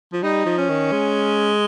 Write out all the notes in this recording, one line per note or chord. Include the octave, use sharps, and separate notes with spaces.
F3
G3 D#4
F3
C#4
D#3
G#3